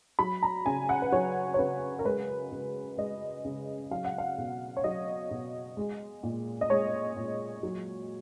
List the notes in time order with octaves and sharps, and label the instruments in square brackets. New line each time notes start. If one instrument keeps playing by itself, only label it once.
[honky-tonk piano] F#3 B5
A#5
C#3 G#5
F#5
B4
F#3 C#5
C#5
C#3 B4
A#4
G#3 B4
C#3
G#3 D#5
C#3
F#3 F5
F#5
F5
B2
C#5
F#3 D#5
B2
G#3
A#2
D#5
G#3 C#5
A#2
F#3